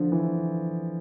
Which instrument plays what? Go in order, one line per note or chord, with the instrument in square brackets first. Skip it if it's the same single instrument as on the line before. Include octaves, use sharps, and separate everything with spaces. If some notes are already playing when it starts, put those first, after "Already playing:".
Already playing: [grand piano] D3 F3
E3